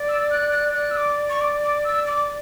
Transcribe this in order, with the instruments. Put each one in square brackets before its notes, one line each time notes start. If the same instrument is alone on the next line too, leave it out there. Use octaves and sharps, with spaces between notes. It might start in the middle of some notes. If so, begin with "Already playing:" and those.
Already playing: [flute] D5
[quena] E6
F#6
F#6
[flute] D5 [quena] F#6
[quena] E6
D6
C#6
D6
D6
E6
D6